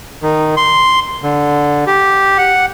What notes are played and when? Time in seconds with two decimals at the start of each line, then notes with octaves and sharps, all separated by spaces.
0.23 D#3
0.57 C6
1.23 D3
1.87 G4
2.38 F#5